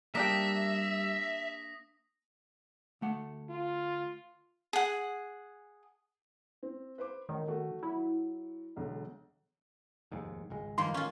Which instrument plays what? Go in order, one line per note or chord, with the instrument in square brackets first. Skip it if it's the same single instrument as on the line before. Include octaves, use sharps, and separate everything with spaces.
[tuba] G3 [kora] A#3 D4 G4 [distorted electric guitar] E5 [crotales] D#6 A#6 B6
[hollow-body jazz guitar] D2 A3 F#5
[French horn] F4
[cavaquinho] G#4 F#5
[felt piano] C4
B4 C5 D6
[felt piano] A1 [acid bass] D#3
[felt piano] A3 F#4
[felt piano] F#3 [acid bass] E4
[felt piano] E1 B1 D3
[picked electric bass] F1 D#2 G#2
G#1 C#2 G#3
[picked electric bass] G2 F3 [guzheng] D#3 A#3 [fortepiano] C6
[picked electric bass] A1 [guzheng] C#4 F4